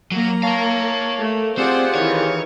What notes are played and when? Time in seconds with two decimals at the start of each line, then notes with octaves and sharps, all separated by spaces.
0.12 F#3 A#3 A#5
0.43 A#4 C#5 F5 A5
1.20 A3
1.58 C4 F4 G4 G#4 C5 D5 F#5
1.95 D#3 E3 C#5